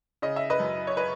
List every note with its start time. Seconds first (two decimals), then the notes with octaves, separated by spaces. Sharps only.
0.22 C#3 D#5
0.36 E5
0.50 B4 D#5
0.60 F#2
0.87 C#5
0.97 B4 D#5